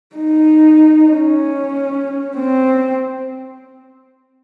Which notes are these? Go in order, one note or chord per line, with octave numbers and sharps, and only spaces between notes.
D#4
C#4
C4